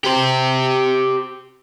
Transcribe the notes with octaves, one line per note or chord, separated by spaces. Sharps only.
G4 C5